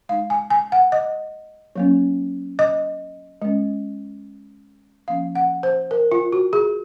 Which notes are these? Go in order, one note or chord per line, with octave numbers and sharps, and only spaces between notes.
G#3 D#4 F5
G#5
G#5
F#5
D#5
F#3 A#3 C#4
D#5
G#3 C#4
F3 A#3 C#4 F5
F#5
C5
A#4
F4
F#4
G#4